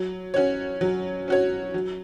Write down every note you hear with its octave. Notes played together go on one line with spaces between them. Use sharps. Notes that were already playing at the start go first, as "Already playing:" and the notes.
Already playing: F#3
C#4 F#4 C#5
F#3
C#4 F#4 C#5
F#3